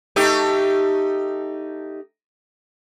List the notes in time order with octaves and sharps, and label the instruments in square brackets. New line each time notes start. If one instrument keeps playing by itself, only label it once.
[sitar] A3 D#4 G4